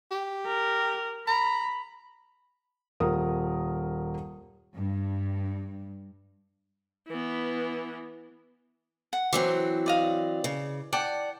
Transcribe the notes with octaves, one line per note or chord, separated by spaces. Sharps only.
G4
A#4
A#5 B5
D#1 A#4 D#6
G2
E3 B3
F#5
E3 F#3 C4 D6
D5 D#5 F5
C#3
D5 F#5 G5 A5